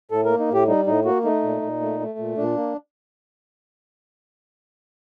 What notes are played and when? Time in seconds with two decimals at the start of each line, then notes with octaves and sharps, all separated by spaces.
0.11 A2 A4
0.26 A#3 A#4
0.40 D#4
0.49 A2 G4
0.68 G3 D#4
0.87 A2 D#4
1.05 A#3 F#4
1.24 A3 D#4
1.43 A#2
1.62 A#2
1.81 A3
2.00 A3
2.19 A#2
2.37 A#2 D4
2.56 A#3